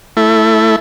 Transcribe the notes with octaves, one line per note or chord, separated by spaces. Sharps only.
A3 E4